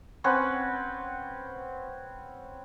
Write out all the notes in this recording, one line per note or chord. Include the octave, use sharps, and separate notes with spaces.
C4 C#4 B4 F#5